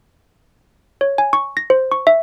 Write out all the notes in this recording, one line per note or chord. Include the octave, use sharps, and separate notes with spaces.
C#5
G#5
C#6
A#6
C5
C#6
E5